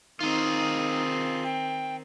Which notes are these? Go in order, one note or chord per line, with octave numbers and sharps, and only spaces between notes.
D#3 C4 D#4 F4 G#4
G5